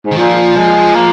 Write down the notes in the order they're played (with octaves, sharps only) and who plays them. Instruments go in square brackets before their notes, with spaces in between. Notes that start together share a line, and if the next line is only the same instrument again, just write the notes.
[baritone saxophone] G#2
[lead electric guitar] D#3
[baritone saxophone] A#2 [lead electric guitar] F3
[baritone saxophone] G#3
A#3